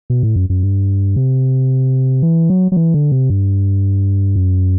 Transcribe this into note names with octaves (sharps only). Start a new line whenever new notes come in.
B2
A2
F#2
F#2
G2
C3
E3
F#3
F#3
E3
D3
C3
G2
F#2